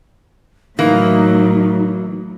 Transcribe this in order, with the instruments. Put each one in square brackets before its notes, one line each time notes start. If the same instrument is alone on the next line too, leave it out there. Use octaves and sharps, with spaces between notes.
[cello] A2 F#3 [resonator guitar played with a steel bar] E3 A#3 [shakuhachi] D#4